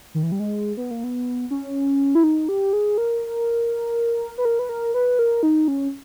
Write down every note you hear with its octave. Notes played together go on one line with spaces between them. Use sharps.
D#3
E3
G3
G#3
B3
A#3
B3
C#4
E4
D#4
G4
G#4
A#4
B4
A#4
B4
A#4
B4
A#4
D#4
C#4